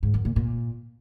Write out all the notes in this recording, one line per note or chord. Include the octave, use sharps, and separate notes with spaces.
G#2
F#2
A#2
A#2